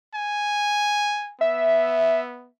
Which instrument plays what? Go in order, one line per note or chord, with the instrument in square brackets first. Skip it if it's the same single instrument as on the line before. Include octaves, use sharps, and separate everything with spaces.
[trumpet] G#5
[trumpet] B3 [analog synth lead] E5